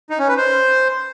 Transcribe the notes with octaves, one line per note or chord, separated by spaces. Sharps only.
D#4
C#4
B4
C5